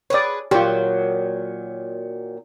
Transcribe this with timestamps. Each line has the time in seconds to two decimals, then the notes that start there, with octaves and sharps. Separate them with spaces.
0.10 G#4 B4 C#5 D5
0.51 A#2 D#3 F#3 F4 G4